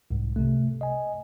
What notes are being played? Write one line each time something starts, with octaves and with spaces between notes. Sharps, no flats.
C2 G#2
C3 A3
D#5 G#5